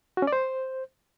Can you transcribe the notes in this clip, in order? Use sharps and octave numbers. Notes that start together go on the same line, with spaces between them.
F#4
C#4
D5
C5